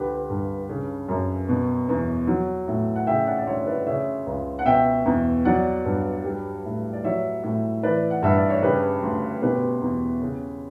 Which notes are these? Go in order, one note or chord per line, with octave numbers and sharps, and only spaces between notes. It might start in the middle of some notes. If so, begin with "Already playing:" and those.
Already playing: C#2 D3 G4 B4
G2
C#3
F#2
B2
E2
F#3
A2
F#5
C#3 E5 G5
D5 F#5
D5
D2 C#5 E5
B4 D5
C#3 C#5 E5
C#2
F#5
B2 E5 G5
E2
F#3 D5 F#5
G2
G3
A2
D5
F#3 C#5 E5
A2
E3 B4 D5
F#5
G2 E5
D5
C#5
C#3 G4 B4
D2
B2 G4 B4
E2
C#3